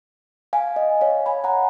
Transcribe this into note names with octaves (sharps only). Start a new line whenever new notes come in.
F5 G#5
D#5
C#5 F5
G#5 B5
F#5 A#5